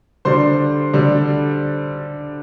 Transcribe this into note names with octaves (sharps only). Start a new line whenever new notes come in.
D3 G3 D4 C5 C6
D3 G3 D4